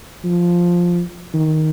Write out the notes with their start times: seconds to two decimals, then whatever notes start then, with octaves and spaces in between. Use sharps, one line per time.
0.24 F3
1.34 D#3